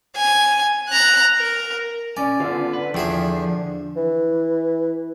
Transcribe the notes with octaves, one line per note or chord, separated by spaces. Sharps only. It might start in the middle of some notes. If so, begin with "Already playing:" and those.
G#5
A#5 F#6
A#4
C#4 D5 G#5
D3 B3 F4
B4
E2 F3 G#4 A4 E5 G5
E3